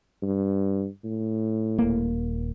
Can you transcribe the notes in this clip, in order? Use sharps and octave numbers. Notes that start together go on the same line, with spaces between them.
G2
A2
D#1 A#3